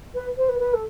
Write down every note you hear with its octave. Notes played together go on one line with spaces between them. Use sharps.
B4
C5
B4
B4
A4